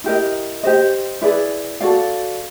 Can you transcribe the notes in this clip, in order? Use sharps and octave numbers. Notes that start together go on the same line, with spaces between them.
E4 G4 A#4 D#5
G4 C5 D#5
E4 G#4 B4 D5
F#4 A4 D5 F5